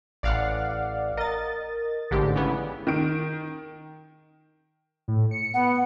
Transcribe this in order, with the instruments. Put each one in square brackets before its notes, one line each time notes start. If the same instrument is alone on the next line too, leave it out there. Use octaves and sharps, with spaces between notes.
[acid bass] A1 [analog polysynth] D5 F5 F#5
[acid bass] A#4 [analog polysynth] D#5 A6
[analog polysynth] A1 G#2 G4 [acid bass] D3
[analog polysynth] C#3 E3 B3
[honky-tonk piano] D#3 D7
[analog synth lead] A2
C#7
[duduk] B3 [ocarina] F#5